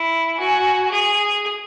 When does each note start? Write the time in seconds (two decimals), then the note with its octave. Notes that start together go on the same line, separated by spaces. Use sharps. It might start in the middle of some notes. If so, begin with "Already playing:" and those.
Already playing: E4
0.39 F#4 G#5
0.91 G#4